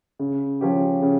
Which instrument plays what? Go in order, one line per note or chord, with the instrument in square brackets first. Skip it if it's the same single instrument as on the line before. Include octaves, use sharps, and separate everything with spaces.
[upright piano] C#3
F3 C#4 G4
C#3